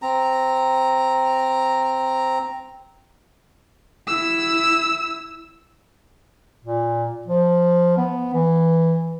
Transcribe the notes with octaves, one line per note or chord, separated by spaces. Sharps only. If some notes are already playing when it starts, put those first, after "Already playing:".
C4 A#5
E4 E6
A#2
F3
B3
E3